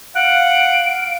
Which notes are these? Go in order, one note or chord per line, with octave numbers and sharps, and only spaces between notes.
F5 F#5 D7